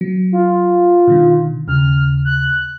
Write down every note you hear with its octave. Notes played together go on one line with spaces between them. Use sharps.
F#3
F4
B2 D3 D#3
D#2 C#3 F6
F#6